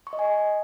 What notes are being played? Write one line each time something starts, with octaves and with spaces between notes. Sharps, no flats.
C#6
D#5
G#5